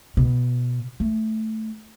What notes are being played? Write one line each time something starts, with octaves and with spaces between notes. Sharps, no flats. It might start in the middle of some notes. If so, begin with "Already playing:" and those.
B2
A3